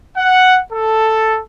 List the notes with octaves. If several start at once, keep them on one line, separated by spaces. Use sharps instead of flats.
F#5
A4